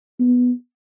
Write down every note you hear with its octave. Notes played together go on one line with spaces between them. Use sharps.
B3